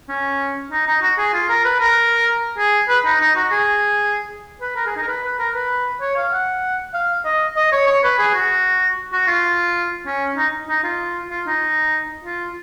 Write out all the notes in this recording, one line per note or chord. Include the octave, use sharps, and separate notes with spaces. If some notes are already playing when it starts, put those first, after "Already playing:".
C#4
D#4
D#4
F#4
G#4
F4
A#4
B4
A#4
G#4
B4
D#4
D#4
F#4
G#4
B4
A#4
G#4
D#4
A#4
B4
B4
A#4
B4
C#5
F5
F#5
F5
D#5
D#5
C#5
C#5
B4
G#4
F#4
F#4
F4
C#4
D#4
D#4
F4
F4
D#4
F4